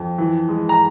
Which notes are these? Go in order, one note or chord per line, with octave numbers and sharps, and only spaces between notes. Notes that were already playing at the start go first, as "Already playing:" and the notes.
Already playing: F2
E3
G#3
A#5